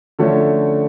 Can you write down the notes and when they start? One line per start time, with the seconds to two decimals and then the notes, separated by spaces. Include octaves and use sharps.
0.19 D3 F3 A3 C#4 F#4